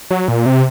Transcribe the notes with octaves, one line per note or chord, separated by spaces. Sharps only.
F#3
A#2
C3